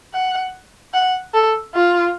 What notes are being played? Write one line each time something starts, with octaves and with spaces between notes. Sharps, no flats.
F#5
F#5
A4
F4